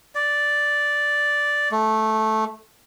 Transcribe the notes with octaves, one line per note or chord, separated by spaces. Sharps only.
D5
A3